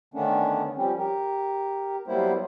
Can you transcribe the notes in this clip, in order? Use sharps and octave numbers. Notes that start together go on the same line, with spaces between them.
D3 D#3 A3 B3 C#4 D4
F3 G3 C4 C#4
G4 A#4
F#3 G3 A#3 B3 E4 C5